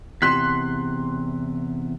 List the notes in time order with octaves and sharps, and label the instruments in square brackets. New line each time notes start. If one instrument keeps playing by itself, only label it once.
[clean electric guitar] E2 C3 [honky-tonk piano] C6 F#6 B6